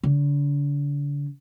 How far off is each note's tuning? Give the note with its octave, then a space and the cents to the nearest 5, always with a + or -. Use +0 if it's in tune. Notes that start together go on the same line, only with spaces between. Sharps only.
D3 -40